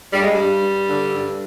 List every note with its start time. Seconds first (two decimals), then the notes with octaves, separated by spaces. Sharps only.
0.12 G2 G3
0.22 G#3
0.33 G2 G3
0.63 G2
0.90 D3
1.15 G2